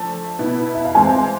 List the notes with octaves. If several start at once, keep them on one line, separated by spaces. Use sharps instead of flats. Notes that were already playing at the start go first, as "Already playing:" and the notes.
Already playing: F3 A3 D4 A5
B2 B3 E4 B4
E5
F5
E3 G#3 C4 G#5